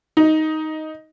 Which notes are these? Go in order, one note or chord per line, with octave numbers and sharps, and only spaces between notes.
D#4